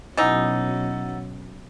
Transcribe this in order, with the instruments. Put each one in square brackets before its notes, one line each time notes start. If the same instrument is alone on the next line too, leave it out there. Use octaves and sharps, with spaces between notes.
[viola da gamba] B2 F#3 C#4 [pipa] E3 D#4 [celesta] F#5 E6 A6